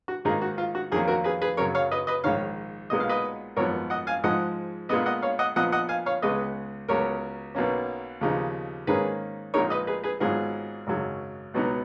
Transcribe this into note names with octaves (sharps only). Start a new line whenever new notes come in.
F#4
G#2 D#3 A#3 D#4 F4 G#4
F#4
F4
F#4
F2 D#3 F#3 A#3 F4 G#4
F#4 A#4
G#4 B4
G#4 B4
F#2 C#3 F#3 C#4 A#4 C#5
C#5 F5
B4 D#5
B4 D#5
A#1 G#2 D#3 C#5 F5
B1 A#2 G#3 B3 D#5
F5
B4 D#5
G#1 F#2 F3 B3 A#4 C#5
D#5 F#5
F5 G#5
G#2 F3 G#3 D#5 F#5
A#2 G#3 B3 B4 D#5
D#5 F#5
C#5 F5
D#5 F#5
A#2 F3 B3 D#5 F#5
D#5 F#5
F5 G#5
C#5 F5
C#2 C#3 G#3 B3 B4 D#5
C#2 C#3 F#3 B3 A#4 C#5
B1 B2 A#3 C#4
D#2 C#3 F3 B3 D#4
G#2 D#3 A#3 C#4 G#4 B4
A#1 A#2 G#3 D#4 A#4 C#5
B4 D#5
G#4 B4
G#4 B4
G#1 G#2 F#3 B3 F4 G#4
G#1 F#2 C#3 F#3
C#2 B2 F#3 B3 D#4